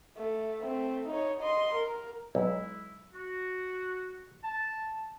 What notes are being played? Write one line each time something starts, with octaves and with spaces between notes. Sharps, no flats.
A3
A3 C4
D#4 C#5
D#5 C6
A#4
B1 G#3 E4
F#4
A5